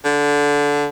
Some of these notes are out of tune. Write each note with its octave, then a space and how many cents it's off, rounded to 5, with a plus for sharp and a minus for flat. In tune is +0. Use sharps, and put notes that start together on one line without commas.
D3 -15